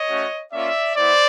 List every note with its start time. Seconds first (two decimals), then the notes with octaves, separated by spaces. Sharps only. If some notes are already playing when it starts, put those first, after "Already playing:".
Already playing: C#5 D#5
0.09 A3 C#4 F#4
0.53 A#3 C#4 F4 D5 E5
0.96 B3 E4 C5 D5